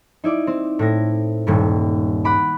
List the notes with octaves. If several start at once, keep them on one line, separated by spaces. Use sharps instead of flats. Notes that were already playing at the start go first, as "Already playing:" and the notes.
D#4 E4 D5 D6
C4
A2 E4 A#6
D#1 G2 A#2
F#5 B5 D6